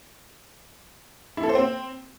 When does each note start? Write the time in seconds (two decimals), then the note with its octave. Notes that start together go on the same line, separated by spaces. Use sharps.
1.37 E4
1.43 A4
1.49 C5
1.55 C4